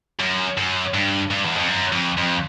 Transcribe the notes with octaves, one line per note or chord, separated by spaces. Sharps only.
F#2
F#2
G2
G2
E2
F2
F#2
F2
F2